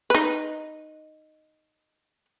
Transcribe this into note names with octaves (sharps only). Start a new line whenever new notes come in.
D#4 B4